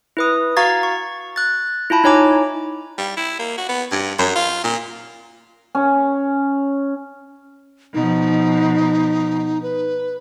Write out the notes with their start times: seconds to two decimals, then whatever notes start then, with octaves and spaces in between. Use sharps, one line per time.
0.17 E4 B4 D#6
0.57 F#4 F5 A#5 C#6 G#6 A6
0.83 C#6
1.36 F#6 A6
1.90 E4 F4 A5 B5
2.04 D#4 E4 C#5 G#5 A#5 D6
2.98 G3
3.17 E4
3.39 A#3
3.58 F#4
3.69 B3
3.91 G2
4.19 F#2
4.36 F4
4.64 A#2
5.75 C#4
7.94 B2 F3 D#4
9.62 B4